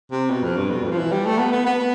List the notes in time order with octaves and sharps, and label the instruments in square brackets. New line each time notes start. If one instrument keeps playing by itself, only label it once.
[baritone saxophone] C3
B2
F2
G2
B2
F2
F3
E3
G3
A3
B3
B3
B3
B3